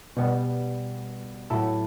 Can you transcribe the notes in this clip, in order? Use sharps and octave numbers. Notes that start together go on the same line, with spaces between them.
B2 G3 B3
A2 F#3 B3 E4 A4